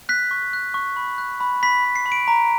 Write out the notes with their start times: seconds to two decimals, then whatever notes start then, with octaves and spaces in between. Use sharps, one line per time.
0.09 F#6 B6
0.31 C#6
0.53 F#6
0.74 C#6
0.97 B5
1.18 F#6
1.40 B5
1.63 B5 B6
1.85 B5
1.96 C7
2.06 B5
2.12 D7
2.28 A#5